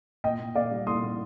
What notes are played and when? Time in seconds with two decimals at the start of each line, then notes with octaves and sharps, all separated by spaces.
0.24 A#2 D#5 G5
0.39 A#2
0.55 A#3 D5 F5
0.71 G3
0.87 A#2 C6 D#6
1.03 A#2